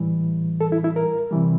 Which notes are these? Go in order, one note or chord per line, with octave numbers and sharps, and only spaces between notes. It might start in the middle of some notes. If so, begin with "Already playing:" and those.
Already playing: A2 E3 G3
A4
E4
E4
A#4
C3 E3 G3